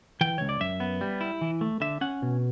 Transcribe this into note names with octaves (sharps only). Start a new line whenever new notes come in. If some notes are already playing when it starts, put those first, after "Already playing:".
E3 G5
C#2 C#5
D5
F#2 E5
B3
G3
E4
E3
A3
D3 E5
C#4 F#5
B2